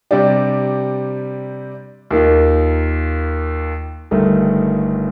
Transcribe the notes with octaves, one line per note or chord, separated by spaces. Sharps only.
C3 G3 D4 G4
D#2 D#3 A#3 F4
G1 G2 D#3 A3